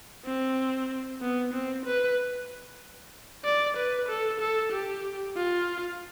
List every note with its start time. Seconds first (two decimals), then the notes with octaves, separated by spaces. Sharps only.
0.25 C4
1.21 B3
1.53 C4
1.86 B4
3.45 D5
3.77 B4
4.09 A4
4.40 A4
4.72 G4
5.36 F4